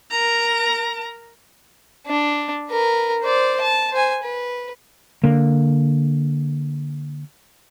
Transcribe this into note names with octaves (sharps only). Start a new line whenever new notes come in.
A#4 A#5
D4
A#4 B4
C5 D5
A5
C5 G#5
B4
D3 A#3